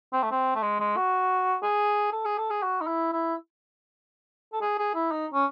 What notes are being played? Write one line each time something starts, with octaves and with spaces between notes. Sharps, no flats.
C4
A3
C4
A3
G#3
G#3
F#4
G#4
A4
G#4
A4
G#4
F#4
D#4
E4
E4
A4
G#4
G#4
E4
D#4
C#4